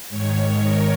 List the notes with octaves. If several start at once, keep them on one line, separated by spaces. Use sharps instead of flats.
G#2 D#3 C#5
A#4